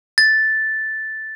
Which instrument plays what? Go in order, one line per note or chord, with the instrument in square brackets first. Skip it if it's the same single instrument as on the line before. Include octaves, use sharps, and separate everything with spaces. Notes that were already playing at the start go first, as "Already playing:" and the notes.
[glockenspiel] A6